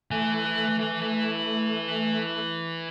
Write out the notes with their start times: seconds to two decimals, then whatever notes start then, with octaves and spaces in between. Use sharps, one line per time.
0.11 E3 A3 G#5